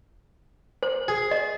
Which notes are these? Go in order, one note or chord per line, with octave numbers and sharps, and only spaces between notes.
C5
G#4
D#5